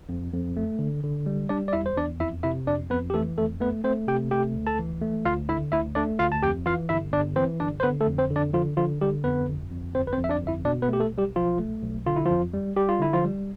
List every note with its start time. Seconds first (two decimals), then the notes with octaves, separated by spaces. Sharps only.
0.09 F2
0.33 F2
0.57 A3
0.79 D3
1.03 D3
1.26 G3
1.49 G3 D4 D5
1.68 D5
1.73 E2 E4 E5
1.86 C5
1.97 E2 D4 D5
2.20 F2 E4 E5
2.43 C3 E4 E5
2.67 F2 D4 D5
2.90 F2 B3 B4
3.10 G4
3.14 E3 A3 A4
3.37 F2 A3 A4
3.61 A3 B3 B4
3.84 A3 C4 C5
4.07 C3 G4 G5
4.31 A3 G4 G5
4.56 D2
4.67 A4 A5
4.79 E3
5.01 A3
5.25 D2 F4 F5
5.49 D3 E4 E5
5.72 D2 E4 E5
5.95 A3 D4 D5
6.19 D2 F4 F5
6.32 A5
6.43 F2 G4 G5
6.66 E3 F4 F5
6.89 G1 E4 E5
7.13 G1 D4 D5
7.36 E3 C4 C5
7.60 G1 D4 D5
7.80 C5
7.83 D3 B3 B4
8.01 A3 A4
8.08 F2
8.18 C4 C5
8.30 D3
8.36 D4 D5
8.53 D3 F3 F4
8.77 D3 F3 F4
9.01 D3 G3 G4
9.24 F2 B3 B4
9.48 G1
9.71 F2
9.95 G1 C4 C5
10.07 B4
10.13 C4 C5
10.18 F2
10.24 E5
10.30 D4 D5
10.42 G1
10.47 E4 E5
10.65 B2 D4 D5
10.82 B3 B4
10.88 A3
10.93 G4
11.00 A3 A4
11.13 B1
11.18 G3 G4
11.35 B1 F3 F4
11.59 A3
11.82 B1
12.06 D3 F4
12.16 E4
12.26 F2 F3 F4
12.54 G3
12.76 G3 G4
12.89 F4
12.99 D3 E4
13.13 F3 F4
13.24 G3